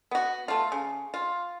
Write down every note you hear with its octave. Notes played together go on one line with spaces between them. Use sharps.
B3 F#4
A3 F4
C#3
F4